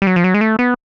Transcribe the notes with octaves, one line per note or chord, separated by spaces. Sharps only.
G3
F#3
F3
F#3
G#3
A3
B3